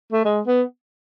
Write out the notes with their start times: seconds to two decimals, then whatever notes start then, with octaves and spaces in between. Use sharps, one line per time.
0.13 A3
0.25 G#3
0.47 B3